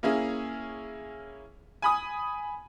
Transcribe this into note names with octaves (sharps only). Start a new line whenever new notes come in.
A#3 C#4 E4 G#4
G#5 B5 D#6